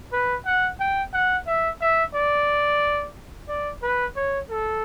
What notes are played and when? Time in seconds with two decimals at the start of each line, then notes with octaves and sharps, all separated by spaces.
0.13 B4
0.46 F#5
0.80 G5
1.14 F#5
1.47 E5
1.81 E5
2.15 D5
3.49 D5
3.83 B4
4.16 C#5
4.50 A4